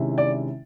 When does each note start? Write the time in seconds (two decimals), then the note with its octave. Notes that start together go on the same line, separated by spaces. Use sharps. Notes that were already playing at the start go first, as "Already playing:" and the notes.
Already playing: C3 D#3 G#3 C#4 E4
0.18 D5